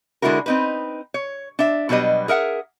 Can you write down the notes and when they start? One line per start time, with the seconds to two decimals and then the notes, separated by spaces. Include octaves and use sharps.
0.22 D3 G#3 D4 E4 F#4 A#4
0.46 C4 D#4 B4
1.14 C#5
1.59 D4 E5
1.89 B2 F#3 G3 B4 D#5
2.28 G#4 A#4 E5 F#5